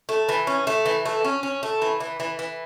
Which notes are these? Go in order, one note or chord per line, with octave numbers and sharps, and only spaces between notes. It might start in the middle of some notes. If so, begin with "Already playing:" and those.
A3
E3
C#4
A3
E3
A3
C#4
C#4
A3
E3
E3
E3
E3